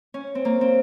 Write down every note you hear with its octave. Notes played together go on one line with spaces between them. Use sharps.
C#4
C4
A#3
C4